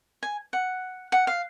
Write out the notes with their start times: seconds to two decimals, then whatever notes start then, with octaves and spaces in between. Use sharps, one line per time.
0.23 G#5
0.53 F#5
1.12 F#5
1.27 F5